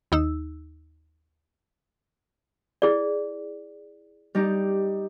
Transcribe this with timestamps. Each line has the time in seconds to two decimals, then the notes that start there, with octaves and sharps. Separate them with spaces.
0.12 D#2 D#4 E6
2.82 E4 G#4 D5
4.35 G3 D#4 G4